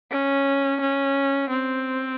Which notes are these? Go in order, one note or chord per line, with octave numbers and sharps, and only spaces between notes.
C#4
C#4
C4